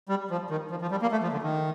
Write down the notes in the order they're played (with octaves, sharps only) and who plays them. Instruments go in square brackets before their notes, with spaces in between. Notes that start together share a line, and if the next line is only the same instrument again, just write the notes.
[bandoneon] G3
F3
D#3
F3
F3
G3
A#3
A3
F3
D3
D#3